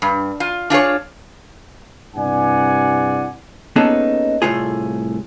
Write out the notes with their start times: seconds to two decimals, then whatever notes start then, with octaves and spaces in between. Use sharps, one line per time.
0.02 G2
0.40 F4
0.70 D4 F4 G#4 C#5
2.15 G2 C3 E4 D5 F#5 G#5
3.76 A#3 B3 C#4 D#4 G#4 A4
4.42 C2 A2 A3 F4 G#4